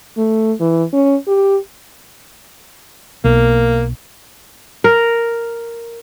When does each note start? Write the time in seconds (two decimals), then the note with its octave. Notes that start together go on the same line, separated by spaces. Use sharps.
0.18 A3
0.60 E3
0.93 C#4
1.27 G4
3.24 B1 A#3
4.84 A#4